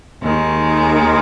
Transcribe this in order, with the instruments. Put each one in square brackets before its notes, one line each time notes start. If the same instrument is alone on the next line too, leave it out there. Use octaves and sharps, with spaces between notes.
[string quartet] D#2 D#3 G#3